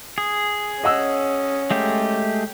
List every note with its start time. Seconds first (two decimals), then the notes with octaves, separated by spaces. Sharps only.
0.18 G#4
0.84 C#4 D#5 F#5 E6
1.71 G#3 A3 G4